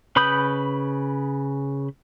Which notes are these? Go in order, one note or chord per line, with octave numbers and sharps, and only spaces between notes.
C#3 B4 B5 D#6 G6